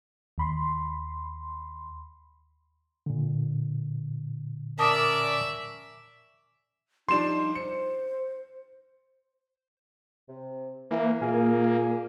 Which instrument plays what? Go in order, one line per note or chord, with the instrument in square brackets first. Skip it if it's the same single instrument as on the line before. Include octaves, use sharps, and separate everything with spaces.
[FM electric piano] D#2 B5 C6
[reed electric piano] A#2 D3
[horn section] C#4 A#4 D5 [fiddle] E5 [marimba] A5 D6 D#6
[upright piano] F3 G3 D4 [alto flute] D#4 [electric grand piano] C6 E7
[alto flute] C5 [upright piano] C#7
[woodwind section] C3
[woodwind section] E3 [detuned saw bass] A#3
[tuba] A#2 [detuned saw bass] A#3 [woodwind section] G#4 F5 G#5